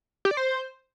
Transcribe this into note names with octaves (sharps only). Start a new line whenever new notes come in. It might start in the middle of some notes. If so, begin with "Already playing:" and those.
G4
D5
C5